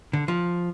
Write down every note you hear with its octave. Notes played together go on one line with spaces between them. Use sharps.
D3
F3